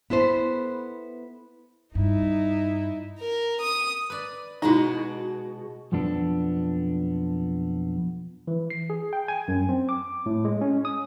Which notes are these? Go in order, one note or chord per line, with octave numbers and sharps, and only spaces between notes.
B3 E4 A4 C5
G2 D#4 E4
A#4
D#6
B4 D5
B2 G#3 D#4 E4 F#4
B1 F2 F3 B3 D4 A4
E3
C7
G#4
G5
G#5
F#2
C4
D6
A2
G#3
C#4
D#6